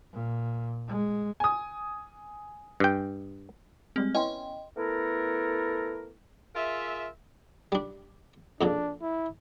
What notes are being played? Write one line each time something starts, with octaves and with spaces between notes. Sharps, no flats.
A#2
G#3
G#5 D#6
G2 G5
G3 G#3 C4 G#4
B3 C#4 E4 D#5 G5 C6
A3 B3 E4 A4 A#4
F4 G#4 A#4 E5
G3 D4
F2 A#2 C#3 D4
E4